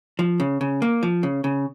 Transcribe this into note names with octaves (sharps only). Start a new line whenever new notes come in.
F3
C#3
C#3
A#3
F3
C#3
C#3